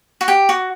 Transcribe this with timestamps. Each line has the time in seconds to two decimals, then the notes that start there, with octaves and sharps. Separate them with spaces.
0.21 F#4
0.28 G4
0.49 F#4